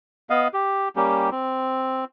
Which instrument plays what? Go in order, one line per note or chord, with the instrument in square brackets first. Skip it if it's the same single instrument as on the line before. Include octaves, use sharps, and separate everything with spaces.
[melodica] B3 D#5 F5
G4
G3 A#3 C#4 G4
C4